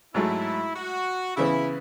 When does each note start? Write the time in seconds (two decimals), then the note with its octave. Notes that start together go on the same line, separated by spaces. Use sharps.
0.14 G#2 F#3 A3 E4
0.76 F#4
1.37 C#3 E3 B3 E4